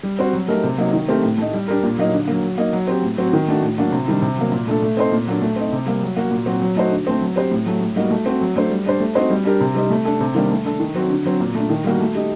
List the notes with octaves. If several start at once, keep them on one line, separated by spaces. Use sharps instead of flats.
G3
C4 F#4 C5
F#3
A3 D#4 G4 A#4
C3
F#3 A#3 D#4
D#3
A3 C4 G4 A#4
A2
A3 D#4
G3
D4 G4 A#4
A#2
F#3 A#3 D#4
D3
F#3 A#3
F#3
A#3 D#4
F#3
C4 G4
A2
F#3 C4 F#4
D#3
A3 D4 F#4
A2
F#3 A#3 D4 F#4
C3
D#3 G3 D4
C3
F#3 A#3
A#2
A3 D4 A4
A3
C4 D#4 A4 C5
A#2
F#3 A#3 D4
A3
C4 D#4
C3
G3 A#3
F#3
A#3 F#4
A#2
F#3 C4 F#4
F#3
A3 D#4 F#4 C5
D3
A3 C4
F#3
C4 G4 C5
A2
F#3 A3
A2
G3 A#3 D#4 F#4
A3
C4 F#4
F#3
A3 D4 A4 C5
G3
D4 G4 C5
A3
C4 D#4 F#4 C5
G3
D4 G4 A#4
C3
G3 C4 D#4 G4
A3
D4 A4
C3
D#3 G3 A#3 D4
A3
D4 A4
D#3
F#3 C4 F#4
D3
F#3 C4
A#2
A3 D4
D#3
G3 A#3 F#4
A3
D#4 G4